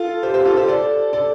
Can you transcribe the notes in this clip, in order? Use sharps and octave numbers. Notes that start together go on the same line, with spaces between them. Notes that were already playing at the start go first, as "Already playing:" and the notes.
Already playing: F4 A4
G4 C5
G4 C5
F4 A4
G4 C5
A4 D5
A4 D5